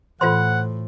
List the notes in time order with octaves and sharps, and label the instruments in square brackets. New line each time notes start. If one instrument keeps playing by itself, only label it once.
[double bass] A2 [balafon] E3 A4 [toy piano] F4 C5 C6 [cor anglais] F#5